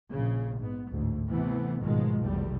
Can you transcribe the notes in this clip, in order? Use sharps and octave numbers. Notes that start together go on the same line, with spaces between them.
A#1 C#3
G#2 B3
A1 D2 G#2
C3 E3 A3 B3
A1 G#2 B2 D#3 F3 G#3
F1 B1 E2 G3